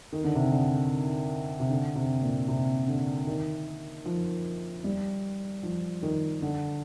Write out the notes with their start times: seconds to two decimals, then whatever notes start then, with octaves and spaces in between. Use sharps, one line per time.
0.13 D#3
0.24 D3
0.35 C3
0.47 D3
1.60 C3
1.69 D3
1.95 C3
2.22 A#2
2.48 C3
2.88 D3
3.27 D#3
4.05 F3
4.84 G3
5.63 F3
6.03 D#3
6.42 D3